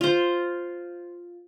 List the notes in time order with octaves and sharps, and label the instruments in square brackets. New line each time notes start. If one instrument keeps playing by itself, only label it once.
[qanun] F4 C5